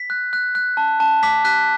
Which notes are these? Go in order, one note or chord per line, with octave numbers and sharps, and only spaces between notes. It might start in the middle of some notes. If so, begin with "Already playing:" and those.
Already playing: B6
F#6
F#6
F#6
A5
A5
D6 B6
F#6 B6